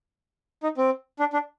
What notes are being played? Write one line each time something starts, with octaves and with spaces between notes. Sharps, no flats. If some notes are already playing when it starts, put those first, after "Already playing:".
D#4
C4
D4
D4